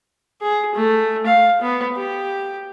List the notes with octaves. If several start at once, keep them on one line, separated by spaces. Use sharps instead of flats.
G#4
A3
F5
B3
G4